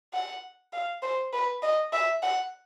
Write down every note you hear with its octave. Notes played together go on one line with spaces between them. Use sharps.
F#5
F5
C5
B4
D#5
E5
F#5